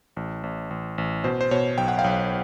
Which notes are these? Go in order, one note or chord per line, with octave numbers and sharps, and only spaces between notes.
A1
A1
A1
A1
B2 C5
C5
B2 C#5
B1 G5
F#5
F5 G5
B1